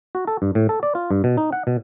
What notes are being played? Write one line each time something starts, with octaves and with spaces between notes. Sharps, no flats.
F#4
A4
G2
A2
A4
D5
F4
G2
B2
D#4
F#5
B2